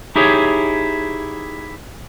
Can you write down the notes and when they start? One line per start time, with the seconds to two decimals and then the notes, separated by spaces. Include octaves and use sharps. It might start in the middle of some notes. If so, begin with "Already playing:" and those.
0.16 D#4 E4 G4 G#4 C#5